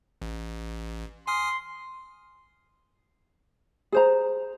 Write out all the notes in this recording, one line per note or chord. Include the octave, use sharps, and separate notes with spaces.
A1
G#5 C6 D#6 F6
G#4 C5 A#5